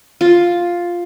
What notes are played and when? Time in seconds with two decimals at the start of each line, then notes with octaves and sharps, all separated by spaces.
0.21 F4